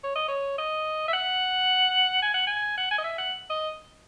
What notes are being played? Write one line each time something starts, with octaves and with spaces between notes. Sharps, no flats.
C#5
D#5
C#5
D#5
E5
F#5
G#5
F#5
G#5
F#5
G#5
D#5
E5
F#5
D#5